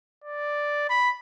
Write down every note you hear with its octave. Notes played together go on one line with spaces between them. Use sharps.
D5
B5